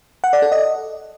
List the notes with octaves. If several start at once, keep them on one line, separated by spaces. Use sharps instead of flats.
F#5
D5
A4
D#5